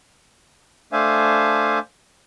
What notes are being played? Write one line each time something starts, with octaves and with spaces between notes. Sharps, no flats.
A3 D4 C5 E5 F5 G#5